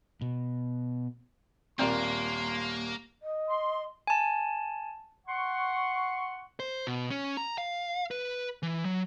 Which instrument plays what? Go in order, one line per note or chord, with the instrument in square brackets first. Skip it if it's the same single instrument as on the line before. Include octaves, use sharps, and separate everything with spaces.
[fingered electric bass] B2
[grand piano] D#1 A#4 D5 [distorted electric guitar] A#3 [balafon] C4 [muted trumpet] C6
[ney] D#5
[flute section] C6
[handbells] G#5 A5
[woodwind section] F#5 C6 C#6
[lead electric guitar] C5
B2
C#4
A#5
F5
B4
E3
F#3